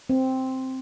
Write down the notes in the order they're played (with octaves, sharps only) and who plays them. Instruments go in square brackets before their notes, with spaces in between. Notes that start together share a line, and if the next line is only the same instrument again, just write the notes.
[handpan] C4